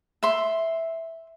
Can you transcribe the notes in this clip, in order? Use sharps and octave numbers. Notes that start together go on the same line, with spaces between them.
E5 C6